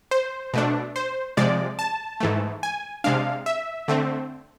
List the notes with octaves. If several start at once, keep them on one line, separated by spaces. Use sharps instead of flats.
C5
B2 A3 D4
C5
C3 F3 G#3 D5
A5
G#2 E3 A3
G#5
C3 G#3 D4 F5
E5
D3 A3 C4